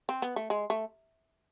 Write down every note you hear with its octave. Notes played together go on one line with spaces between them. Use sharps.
C4
B3
A3
G#3
A3